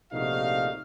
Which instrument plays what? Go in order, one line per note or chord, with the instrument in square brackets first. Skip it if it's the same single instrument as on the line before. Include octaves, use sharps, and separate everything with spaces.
[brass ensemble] A#1 C3 A3 D#4 F#4 F5